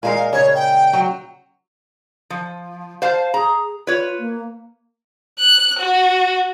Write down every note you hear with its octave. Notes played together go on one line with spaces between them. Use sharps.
A#2 G#3 A#4 F5
C#3 C#5
G5
F#3
F3
C5 F5 A5
G#4 A#5
F4 B4 C#5
A#3
F#6
F#4